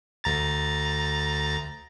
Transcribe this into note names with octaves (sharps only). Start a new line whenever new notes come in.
D2 A#5 A6